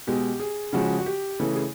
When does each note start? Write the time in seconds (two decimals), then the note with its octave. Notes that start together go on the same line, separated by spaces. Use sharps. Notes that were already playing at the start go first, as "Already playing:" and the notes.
0.07 B2 G#3 G4
0.40 G#4
0.73 C#3 F3 G#3 F#4
0.99 F#4
1.06 G4
1.40 C#3 E3 A3
1.56 G#4